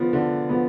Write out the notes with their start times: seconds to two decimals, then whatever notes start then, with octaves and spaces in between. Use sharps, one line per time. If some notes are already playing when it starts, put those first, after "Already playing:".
Already playing: D3 F3 B3
0.13 D3
0.49 F3 B3